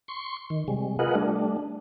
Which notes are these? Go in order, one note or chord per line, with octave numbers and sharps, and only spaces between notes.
C6 C#6
D#3
C3 G3 G#3
F4 G#4 A#4 B4 D#5 F#5
G3 A3 D4